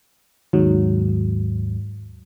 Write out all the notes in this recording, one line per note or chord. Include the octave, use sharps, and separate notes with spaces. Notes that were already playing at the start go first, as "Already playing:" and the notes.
D#2 G#2 F#3